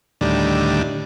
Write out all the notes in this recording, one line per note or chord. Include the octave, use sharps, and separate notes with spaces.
D2 A2 D#3 G3 D4